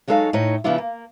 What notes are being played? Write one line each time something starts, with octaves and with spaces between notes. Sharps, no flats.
F#3 G#3 D#4 A4 C#5 F5
A2 D#4 C#5
C#3 F3 B3 D4 E4 F4
A#3